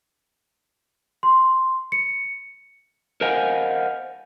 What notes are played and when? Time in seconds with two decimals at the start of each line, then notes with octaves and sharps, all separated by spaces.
1.23 C6
1.92 C#7
3.21 A#4 C5 D#5 F5 F#5 G#5